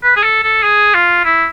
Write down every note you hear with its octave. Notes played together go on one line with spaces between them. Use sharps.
B4
G#4
A4
A4
G#4
F4
E4